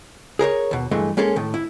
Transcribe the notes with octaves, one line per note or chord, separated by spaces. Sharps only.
G#4 A#4 C5 C#5
D#2 B2
G2 E3 G#3 A3
G#3 A#3 C#4 G#4 A4
A2 D#3
E4